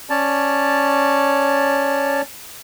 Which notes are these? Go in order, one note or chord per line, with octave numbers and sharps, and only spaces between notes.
C#4 C#5 D5 A5